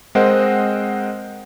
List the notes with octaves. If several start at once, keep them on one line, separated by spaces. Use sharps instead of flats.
G#3 C4 A#4 C5 D#5 F#5